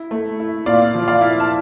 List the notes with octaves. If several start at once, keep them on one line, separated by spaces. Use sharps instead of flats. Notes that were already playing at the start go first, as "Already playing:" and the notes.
Already playing: E4
A3
E4
A#2 D5 F5
F3
D5 F5
E4
A5